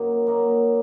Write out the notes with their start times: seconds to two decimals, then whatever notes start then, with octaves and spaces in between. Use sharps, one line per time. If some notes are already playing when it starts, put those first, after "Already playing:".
Already playing: F#2 D#3 F#3 A#3 D#4
0.27 F#3 A#3 D#4